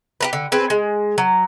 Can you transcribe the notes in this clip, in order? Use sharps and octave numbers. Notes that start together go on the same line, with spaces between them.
G4 A#4 B4
D3
C4 G#4 B4
G#3
F#3